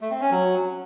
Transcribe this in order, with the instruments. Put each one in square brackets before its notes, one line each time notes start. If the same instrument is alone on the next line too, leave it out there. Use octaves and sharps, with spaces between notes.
[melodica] A3
C4
C#4
F#3